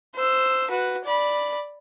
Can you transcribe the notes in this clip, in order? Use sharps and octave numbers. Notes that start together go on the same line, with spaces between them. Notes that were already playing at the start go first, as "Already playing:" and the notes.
C5 E6
F#4 B4
D5 B5